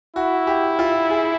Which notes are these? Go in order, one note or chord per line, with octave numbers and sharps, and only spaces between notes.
E4 F#4
G4
F4
G#4